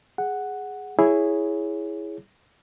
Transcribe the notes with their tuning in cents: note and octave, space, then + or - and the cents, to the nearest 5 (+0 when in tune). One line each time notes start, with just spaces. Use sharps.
G#4 +0 F#5 +0
E4 +0 G#4 +0 C#5 +0